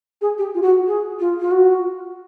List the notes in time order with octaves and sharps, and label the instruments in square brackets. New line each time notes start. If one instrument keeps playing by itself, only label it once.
[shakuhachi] G#4
G4
F4
F#4
G#4
F4
F4
F#4